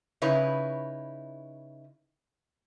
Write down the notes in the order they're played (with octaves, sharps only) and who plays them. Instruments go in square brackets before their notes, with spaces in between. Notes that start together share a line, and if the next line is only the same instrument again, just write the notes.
[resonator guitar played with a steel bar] C#3 D#4 E4 B4 C#5